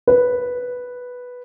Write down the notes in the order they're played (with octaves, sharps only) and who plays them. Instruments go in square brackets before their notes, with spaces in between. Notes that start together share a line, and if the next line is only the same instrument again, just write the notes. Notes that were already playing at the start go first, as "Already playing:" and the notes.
[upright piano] B4